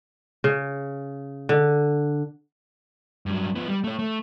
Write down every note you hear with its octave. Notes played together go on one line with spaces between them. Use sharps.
C#3
D3
G2 F#3
F3 B3
G3
A3 C#5
A3